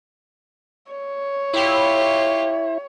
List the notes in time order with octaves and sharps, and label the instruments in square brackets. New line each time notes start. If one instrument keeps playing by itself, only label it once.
[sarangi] C#5
[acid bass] E4 [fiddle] F4 G4